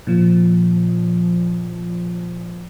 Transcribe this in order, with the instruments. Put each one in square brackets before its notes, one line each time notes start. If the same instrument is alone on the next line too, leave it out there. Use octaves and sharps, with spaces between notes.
[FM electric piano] A#2 F3